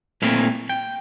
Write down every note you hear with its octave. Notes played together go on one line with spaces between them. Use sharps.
A#2 A3 C4 E4 F5
G5